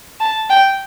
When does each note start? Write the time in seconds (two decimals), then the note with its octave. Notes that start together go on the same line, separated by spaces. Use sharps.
0.20 A5
0.50 G5